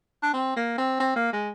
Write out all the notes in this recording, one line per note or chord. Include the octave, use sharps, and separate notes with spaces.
D4
C4
A#3
C4
C4
A#3
G#3